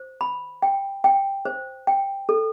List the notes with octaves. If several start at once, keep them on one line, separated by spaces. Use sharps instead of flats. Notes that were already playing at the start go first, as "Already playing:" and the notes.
Already playing: C5
B5
G5
G5
C5
G5
A4